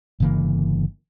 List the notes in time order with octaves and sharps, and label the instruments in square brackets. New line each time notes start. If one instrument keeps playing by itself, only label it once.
[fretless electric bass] G1 C#3 E3 A#3